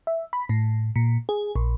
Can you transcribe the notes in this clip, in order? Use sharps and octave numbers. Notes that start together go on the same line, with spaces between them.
E5
B5
A2
A#2
G#4
A#1